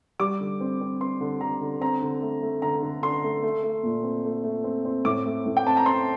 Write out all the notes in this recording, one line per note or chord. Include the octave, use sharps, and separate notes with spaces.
G3 D6
D3
C4
C4
C4 C6
D3
D3 A#5
D3
C4 A#5
D3
A3
A3
D3 A#5
D3
D3 C6
A3
A3
A3
A#2
C4
A3
A3
C4
C4
A2 D6
A3
A2
G5
C4 A5
A#5
C4 C6